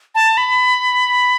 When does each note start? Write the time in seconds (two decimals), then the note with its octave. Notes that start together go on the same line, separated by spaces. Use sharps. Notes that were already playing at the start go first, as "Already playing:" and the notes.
0.15 A5
0.37 B5